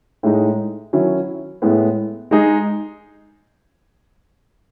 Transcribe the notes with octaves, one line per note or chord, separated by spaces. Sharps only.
A2 G#3 D#4
D#3 F#3 C#4 E4
A2 G#3 B3 E4
G#3 D#4 G#4